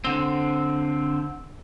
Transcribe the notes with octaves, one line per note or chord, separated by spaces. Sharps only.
D3 C4